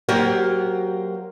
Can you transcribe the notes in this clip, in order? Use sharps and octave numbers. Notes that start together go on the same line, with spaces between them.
F#3 A#3 G4 A#4 C5 F#5